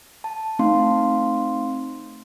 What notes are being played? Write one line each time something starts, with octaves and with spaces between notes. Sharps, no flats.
A5
A3 C4 D#4 F5 C6